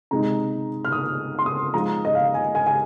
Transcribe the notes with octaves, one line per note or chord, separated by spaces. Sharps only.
C3 G#3 D#4 A#5
F6
D#6
C6
D#6
F3 G#3 D#4 A#5
D#5
F5
G#5
G#5
G#5